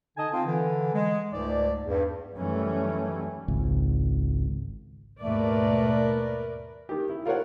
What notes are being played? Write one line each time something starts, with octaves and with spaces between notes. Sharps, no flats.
D3 D#4 D#5 G#5 A5
C4 F4
D3 E3
G#3
C#2 G#2 A3 D5
E2 G2
F#2 D#3 E3 G3 A3 C#4
G#1 C#2
D#2 G#2 B2 A3 A#4 B4 D5
D#3 G4
E4
F4 A#4 C5 C#5 F#5